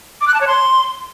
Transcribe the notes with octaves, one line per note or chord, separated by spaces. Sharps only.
D6
F#6
A5
C#5
C6